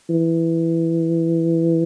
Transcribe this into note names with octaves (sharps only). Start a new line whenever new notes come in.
E3